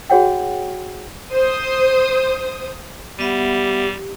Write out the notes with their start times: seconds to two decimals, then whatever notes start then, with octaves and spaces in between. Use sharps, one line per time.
0.10 F#4 G#4 C#5 F#5 G5
1.31 C5 D#6
3.19 G3 B3 G4 E5 F#5